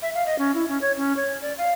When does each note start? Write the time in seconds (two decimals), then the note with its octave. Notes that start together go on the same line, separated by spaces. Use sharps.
0.02 E5
0.15 F5
0.26 D#5
0.39 C#4
0.55 E4
0.68 C#4
0.81 C#5
0.97 C#4
1.17 C#5
1.42 D5
1.58 F5